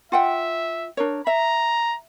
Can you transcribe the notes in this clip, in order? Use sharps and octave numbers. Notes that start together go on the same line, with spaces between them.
F4 E5 F#5 G5
D4 A#4 C#5
E5 A#5